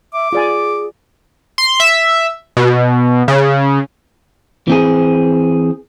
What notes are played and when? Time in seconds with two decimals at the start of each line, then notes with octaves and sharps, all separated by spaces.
0.14 E5 D6
0.33 F4 G#4 D5 G#5
1.58 C6
1.80 E5
2.57 B2
3.28 C#3
4.67 E3 C4 G#4